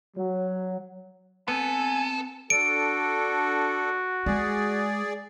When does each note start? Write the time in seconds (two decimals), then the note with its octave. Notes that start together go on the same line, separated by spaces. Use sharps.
0.16 F#3
1.48 B3 C4 A4 B4 G#5
2.50 D4 F#4 A4 D7
4.26 G#3 G#4 D5